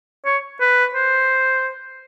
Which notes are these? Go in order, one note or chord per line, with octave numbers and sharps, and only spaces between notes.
C#5
B4
C5